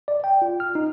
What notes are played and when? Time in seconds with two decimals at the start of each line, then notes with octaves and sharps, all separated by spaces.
0.08 D5
0.24 G5
0.42 F4
0.60 F6
0.75 D#4